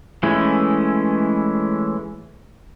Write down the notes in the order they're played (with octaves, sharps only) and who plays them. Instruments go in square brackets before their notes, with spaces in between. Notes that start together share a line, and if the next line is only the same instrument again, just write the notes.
[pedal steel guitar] E3 G#3 A3 C#4 E4